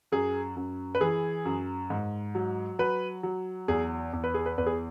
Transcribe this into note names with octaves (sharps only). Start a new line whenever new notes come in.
F#2 G#4
F#2
B4
E3 G#4
F#2
G#2
F#3
F#3 B4
F#3
E2 G#4
E2
B4
G#4
B4
E2 B4
G#4